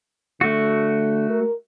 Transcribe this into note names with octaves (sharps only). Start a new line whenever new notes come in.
D3 A3 F#4
A#4